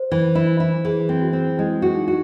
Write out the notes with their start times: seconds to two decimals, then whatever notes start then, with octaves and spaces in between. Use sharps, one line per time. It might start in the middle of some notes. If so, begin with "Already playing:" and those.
Already playing: C5
0.12 E3
0.35 E4
0.60 E4
0.85 E3 G#4
1.09 C4
1.22 F#4
1.33 C4
1.58 G#3 E4
1.82 F#4
1.94 D#4
2.08 F#4